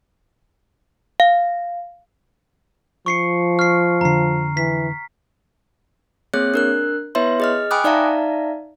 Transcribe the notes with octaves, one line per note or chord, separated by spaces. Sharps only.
F5
F3 C#6 C7 C#7
C#6 F6 C7
F2 D3 A#5 C7
E3 B6
A#3 C4 G#4 C#5 F#6
D4 A#4 F#6
B3 E4 B4 C#5 E5 C6
G#4 D#5 F6
G5 G#5 B5 D6 D#6 F#6
D#4 D5 E5 F5 A5 A#5